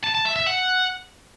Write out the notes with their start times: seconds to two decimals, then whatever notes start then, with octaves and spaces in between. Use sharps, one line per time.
0.04 A5
0.15 A5
0.25 E5
0.36 E5
0.47 F#5